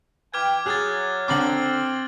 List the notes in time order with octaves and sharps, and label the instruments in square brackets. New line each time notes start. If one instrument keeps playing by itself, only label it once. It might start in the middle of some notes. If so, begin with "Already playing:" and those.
[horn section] E3 B4 G5 [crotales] D6 F6 G#6
[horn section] F#3 [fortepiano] G#4 [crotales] F#6 G#6 A6
[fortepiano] D3 A#5 D6 [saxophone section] C4 [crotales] F6 A6 F#7